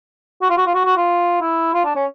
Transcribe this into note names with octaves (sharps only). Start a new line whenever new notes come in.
F#4
F4
F#4
F4
F#4
F#4
F4
E4
F4
D4
C#4